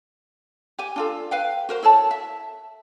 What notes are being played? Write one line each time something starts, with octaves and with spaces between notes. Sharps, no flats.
G4 G#5
D4 F4 A4
B4 F5 G5
F#4 A#4 C5
E4 A4 C#5 A5
E5